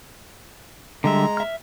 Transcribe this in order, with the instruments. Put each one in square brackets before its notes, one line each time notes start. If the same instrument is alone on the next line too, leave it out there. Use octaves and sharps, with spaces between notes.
[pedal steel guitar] D3 G3 E5 [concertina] G#3 A#5
[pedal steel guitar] E5 F6